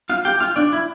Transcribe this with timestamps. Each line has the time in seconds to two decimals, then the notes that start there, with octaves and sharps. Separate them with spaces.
0.09 F4 F5
0.25 G4 G5
0.40 F4 F5
0.56 D4 D5
0.73 E4